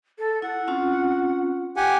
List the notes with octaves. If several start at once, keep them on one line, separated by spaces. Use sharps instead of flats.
A4
E4 F#5
C4 C#4 F4
G4 F#5 G#5